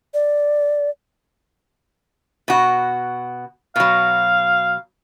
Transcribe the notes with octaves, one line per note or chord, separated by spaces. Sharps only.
D5
B2 F#4
B2 F#3 F5